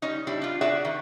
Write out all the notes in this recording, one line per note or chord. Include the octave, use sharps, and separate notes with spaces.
G3 C#4 D#4
G3 D4 E4
D4 F4
F#4 G#4 D5 E5 F#5
D#3